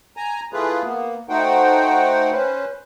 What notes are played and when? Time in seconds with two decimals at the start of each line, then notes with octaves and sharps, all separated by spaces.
0.17 G#5 A#5
0.53 E3 A3 F4 G#4 B4
0.83 A#3 B3
1.29 A3 D#4 F#4 C5 F#5 G5
2.32 C#4 B4 C5